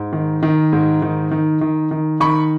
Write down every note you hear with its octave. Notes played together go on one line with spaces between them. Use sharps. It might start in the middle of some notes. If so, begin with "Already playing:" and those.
Already playing: G#2
D#3
D#3
G#2
D#3
D#3
D#3
D#3
D#3 B5 C#6